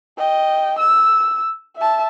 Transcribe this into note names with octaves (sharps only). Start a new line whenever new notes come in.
D#5 G5
E6
E5 A5